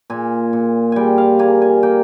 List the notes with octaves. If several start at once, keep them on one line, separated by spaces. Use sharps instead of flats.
A#2 G#5
A#2
G3 G5 G#5
F5
A#3 G#5
G#5
A#3 G5